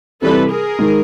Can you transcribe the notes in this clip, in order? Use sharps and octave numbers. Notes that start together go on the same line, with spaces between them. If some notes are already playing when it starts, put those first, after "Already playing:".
C3 E3 G3 C4 A4 B4
G#4 A#4
D#3 G#3